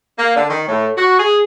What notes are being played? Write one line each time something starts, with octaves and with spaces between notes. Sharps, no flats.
A#3
D3
D#3
A2
F#4
G#4